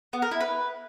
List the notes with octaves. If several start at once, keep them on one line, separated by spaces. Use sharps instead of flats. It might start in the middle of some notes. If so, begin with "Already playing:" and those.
B3
A#4
E4
B4